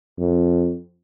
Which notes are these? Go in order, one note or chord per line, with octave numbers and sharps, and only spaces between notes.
F2